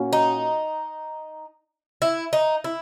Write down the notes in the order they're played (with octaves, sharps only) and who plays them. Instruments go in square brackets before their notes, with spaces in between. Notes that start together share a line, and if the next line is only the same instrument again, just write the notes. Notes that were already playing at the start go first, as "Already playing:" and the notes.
Already playing: [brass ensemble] A#2 A#3 C#4 F#4
[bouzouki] D#4
E4
D#4
E4